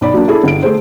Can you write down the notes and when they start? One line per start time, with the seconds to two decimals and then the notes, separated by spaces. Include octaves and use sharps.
0.01 B1 D5 B5
0.14 F#3 A#3 D4
0.28 E4 G#4 A4
0.44 G1 D7
0.62 A3 G#4 C5